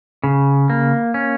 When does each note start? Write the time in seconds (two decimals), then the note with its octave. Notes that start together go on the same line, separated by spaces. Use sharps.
0.23 C#3
0.70 A#3
1.14 C#4